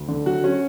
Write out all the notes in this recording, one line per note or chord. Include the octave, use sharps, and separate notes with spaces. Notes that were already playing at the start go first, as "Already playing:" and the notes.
Already playing: D2
D3
F#3 F#4
F#3 C#4